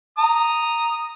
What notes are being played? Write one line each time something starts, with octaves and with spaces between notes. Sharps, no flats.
A#5 D#6